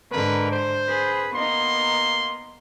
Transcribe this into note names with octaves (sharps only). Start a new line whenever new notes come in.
G#2 D3 A#4 B4
C5
G#4 B4
A#3 B3 D#4 C6